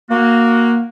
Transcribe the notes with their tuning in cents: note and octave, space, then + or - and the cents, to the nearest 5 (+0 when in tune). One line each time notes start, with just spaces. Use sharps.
A#3 +0 F#4 -10